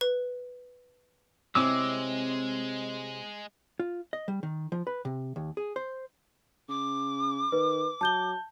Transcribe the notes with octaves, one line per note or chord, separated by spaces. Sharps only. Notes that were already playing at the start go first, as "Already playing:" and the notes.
B4
C3 G#3 C4 E4 C#5 G#5 D6 E6
F4
D#5
G3
D#3
F3
B4
C3
D#2
G#4
C5
C#3 D6
D#3 B4
F#3 A5 G6 G7